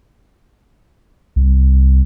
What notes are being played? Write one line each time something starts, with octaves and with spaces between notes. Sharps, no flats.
C2